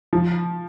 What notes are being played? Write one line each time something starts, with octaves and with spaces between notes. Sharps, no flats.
F3